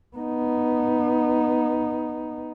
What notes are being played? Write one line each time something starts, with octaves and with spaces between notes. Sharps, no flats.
B3 D#4